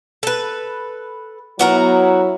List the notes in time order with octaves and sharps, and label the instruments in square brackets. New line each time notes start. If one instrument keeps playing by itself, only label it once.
[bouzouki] A4 B4
[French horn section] F#3 E4 [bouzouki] B3 F#4 A#4